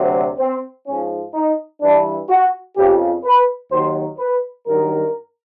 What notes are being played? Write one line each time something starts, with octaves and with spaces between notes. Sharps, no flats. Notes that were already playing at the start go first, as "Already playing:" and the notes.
Already playing: D2 C3 F#3
C4
G#2 F3 C#4
D#4
G2 E3 D4
F#4
F2 C#3 F3 G4
B4
D#2 D#3 F#3 C5
B4
G2 D#3 F#3 A#4